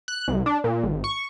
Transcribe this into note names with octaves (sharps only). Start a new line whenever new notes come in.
F#6
C2
D4
A#2
G#1
C#6